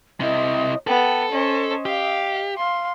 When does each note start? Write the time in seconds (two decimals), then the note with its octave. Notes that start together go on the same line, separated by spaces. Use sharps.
0.20 C3 E4 D#5
0.87 B3 A4 G5
1.31 C#4 C5 D#5
1.86 G4 F5
2.57 F5 C6